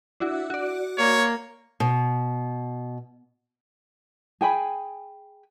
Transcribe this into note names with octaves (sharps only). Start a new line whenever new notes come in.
D4 E4 F#4
F#4 D5
A#3 C#5
B2
G#4 G5 G#5 B5